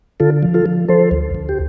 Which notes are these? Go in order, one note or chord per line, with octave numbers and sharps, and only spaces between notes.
D3 F4 A4
F3
F4 A4
F3
F3 A4 C5
D2
D2
G4